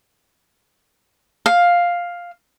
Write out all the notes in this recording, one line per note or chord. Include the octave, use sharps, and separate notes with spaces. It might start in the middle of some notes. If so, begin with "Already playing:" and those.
F5